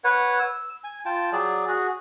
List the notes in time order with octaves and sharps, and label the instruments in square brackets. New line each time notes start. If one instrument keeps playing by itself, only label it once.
[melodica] B4 C#5 F#5
E6
G#5
F4 G5 A5
F#3 G#4 D5
F#4 G#4